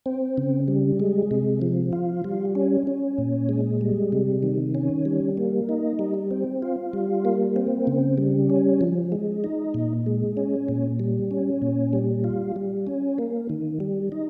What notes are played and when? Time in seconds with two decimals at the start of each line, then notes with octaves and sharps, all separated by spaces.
0.06 C4
0.37 C#3
0.68 G3
1.00 G#3
1.31 C3
1.62 F3
1.93 F4
2.24 G3
2.55 C#4
2.87 C#4
3.18 A#2
3.49 G#3
3.81 G3
4.12 C3
4.43 D#3
4.75 C#4
5.05 G3
5.37 A#3
5.69 D#4
5.99 G3
6.31 C4
6.62 F4
6.93 G3
7.25 A#3
7.56 C4
7.87 C#3
8.18 G3
8.50 C#4
8.81 F3
9.12 G#3
9.44 D#4
9.74 A#2
10.06 G#3
10.37 C#4
10.69 A#2
11.00 G3
11.31 C#4
11.62 A#2
11.93 G3
12.24 F4
12.56 G3
12.87 C#4
13.18 A#3
13.50 D#3
13.80 G3
14.12 D#4